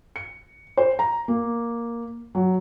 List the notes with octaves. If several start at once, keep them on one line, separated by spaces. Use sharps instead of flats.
C#7
C5
A#5
A#3
F#3